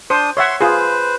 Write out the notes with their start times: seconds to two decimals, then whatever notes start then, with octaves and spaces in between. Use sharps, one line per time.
0.10 D4 C5 D#6
0.37 C#5 E5 F#5 C6
0.61 F4 G#4 B4 C5